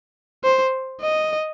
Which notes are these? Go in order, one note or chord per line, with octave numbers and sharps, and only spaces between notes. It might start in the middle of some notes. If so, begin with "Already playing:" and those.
C5
D#5